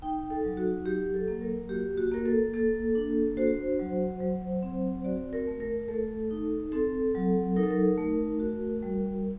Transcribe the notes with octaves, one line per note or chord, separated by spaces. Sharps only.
D#4 G5
A4
F#3
F#4
F#3 G4
A4
A#3
A#4
F#4 G4
F#4
A#3 A#4
A4
A#3 A4
D4
F#4 C5
F#3
F#3
C4
F#4 D5
A#4
A3
A#4
A3 A4
D#4
C4 A4
F#3
D#4 A#4
A4
A#4
A3
F#4
G3